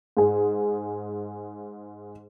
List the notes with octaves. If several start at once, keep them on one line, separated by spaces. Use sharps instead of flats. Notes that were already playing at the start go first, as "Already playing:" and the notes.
G#2 G#4